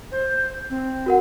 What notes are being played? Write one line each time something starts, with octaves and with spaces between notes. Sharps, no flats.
C5
C4
F#4 A#4 F#5